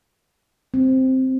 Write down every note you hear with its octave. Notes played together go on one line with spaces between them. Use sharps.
C4